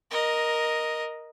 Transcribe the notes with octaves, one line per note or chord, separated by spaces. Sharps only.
A#4 D#5